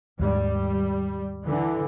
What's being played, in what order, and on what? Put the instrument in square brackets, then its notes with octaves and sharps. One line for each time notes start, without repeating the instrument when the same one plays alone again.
[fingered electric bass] D#2 G#2 D#3 [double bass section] G3
[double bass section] D3 E3